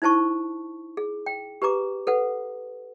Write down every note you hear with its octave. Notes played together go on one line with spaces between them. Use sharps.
D#4 E4 C5 A5 C#6
G#4
G5
G4 B4 A#5 D6
A4 B4 F#5